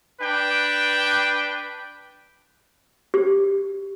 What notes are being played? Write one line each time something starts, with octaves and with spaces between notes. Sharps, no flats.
D4 B4 G5
G4